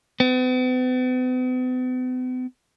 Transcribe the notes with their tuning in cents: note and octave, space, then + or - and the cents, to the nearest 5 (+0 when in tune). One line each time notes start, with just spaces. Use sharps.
B3 +45